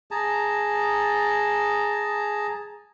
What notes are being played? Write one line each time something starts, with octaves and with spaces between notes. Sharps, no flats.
G#4 A5 A#5